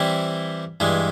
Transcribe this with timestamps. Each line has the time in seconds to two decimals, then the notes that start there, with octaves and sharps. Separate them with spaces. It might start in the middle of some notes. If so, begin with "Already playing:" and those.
Already playing: E3 G3 C4 E4
0.80 G2 E3 G#3